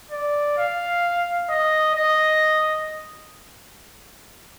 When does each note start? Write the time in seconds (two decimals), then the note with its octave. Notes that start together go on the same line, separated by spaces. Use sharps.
0.11 D5
0.57 F5
1.50 D#5
1.95 D#5